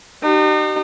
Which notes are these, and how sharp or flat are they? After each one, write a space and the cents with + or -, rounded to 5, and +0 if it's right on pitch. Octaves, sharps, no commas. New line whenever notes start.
D#4 -40 G4 -35